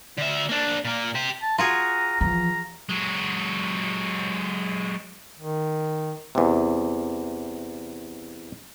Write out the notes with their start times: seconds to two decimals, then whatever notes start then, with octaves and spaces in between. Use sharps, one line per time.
0.18 D3 E5
0.49 A#3 D4
0.85 A#2 A#3
1.15 G4 C5
1.42 A5
1.58 F4 F#4 G#4 A#5
2.21 E3 F3 A#5
2.89 F#3 G#3
5.37 D#3
6.35 E2 C3